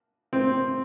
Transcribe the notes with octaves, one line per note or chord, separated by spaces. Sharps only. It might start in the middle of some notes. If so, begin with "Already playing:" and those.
C4